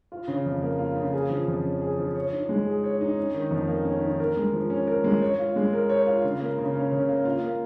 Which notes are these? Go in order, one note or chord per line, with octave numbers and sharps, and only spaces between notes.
F4
C#3
F2
A#3
F4
C#3
G#4
F3
F2
C#4
G#4
F3
C#5
D#4
G#3
G#4
C#5
D#4
C#4
D#3
F2
A#3
C#4
D#3
A#4
G#3
F3
C#4
A#4
G#3
C#5
F4
G#3
A#4
C#5
F4
C#3
A#3
C#3
C#4
C#3
A#3
F4
A#3